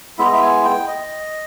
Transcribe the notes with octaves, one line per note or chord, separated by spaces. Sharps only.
G#3 B3 E4 E5
D#5
E5
G#5
G5
D#5